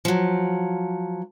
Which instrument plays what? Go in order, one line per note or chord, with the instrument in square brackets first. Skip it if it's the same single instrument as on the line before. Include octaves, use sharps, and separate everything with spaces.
[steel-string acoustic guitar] F3 F#3